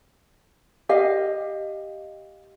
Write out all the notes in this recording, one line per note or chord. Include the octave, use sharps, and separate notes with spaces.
G4 D#5 F5